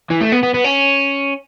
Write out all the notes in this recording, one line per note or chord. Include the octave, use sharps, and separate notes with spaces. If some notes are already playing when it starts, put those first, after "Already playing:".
E3
A3
B3
B3
B3
C#4